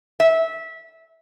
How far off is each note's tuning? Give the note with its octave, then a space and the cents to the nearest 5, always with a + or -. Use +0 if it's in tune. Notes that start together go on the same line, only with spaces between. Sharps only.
E5 -20